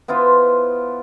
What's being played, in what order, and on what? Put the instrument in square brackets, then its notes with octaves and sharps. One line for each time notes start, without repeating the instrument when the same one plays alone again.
[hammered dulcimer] B3 E4 F4 C5